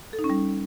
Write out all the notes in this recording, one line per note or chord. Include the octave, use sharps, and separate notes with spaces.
A4
D#4
C#4
G3